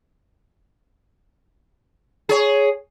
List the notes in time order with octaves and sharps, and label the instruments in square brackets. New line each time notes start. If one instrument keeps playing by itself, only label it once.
[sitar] G#4 C#5